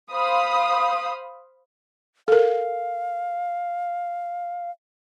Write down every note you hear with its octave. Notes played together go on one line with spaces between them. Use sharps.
C5 F5 B5 D#6
A4 A#4 F5